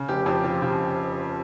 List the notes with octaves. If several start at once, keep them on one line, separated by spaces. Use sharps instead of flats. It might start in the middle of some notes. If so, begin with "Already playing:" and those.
Already playing: C#3
F1 G4
F2 G4
F3 G4
C#3 G4